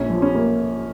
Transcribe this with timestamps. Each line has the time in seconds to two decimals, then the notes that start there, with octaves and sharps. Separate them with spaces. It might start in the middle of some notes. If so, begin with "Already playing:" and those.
Already playing: A#1 C#4
0.10 F3
0.22 C#4
0.35 A#3